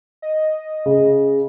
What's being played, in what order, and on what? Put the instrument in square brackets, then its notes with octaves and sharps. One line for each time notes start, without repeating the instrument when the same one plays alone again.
[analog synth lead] D#5
[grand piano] C#3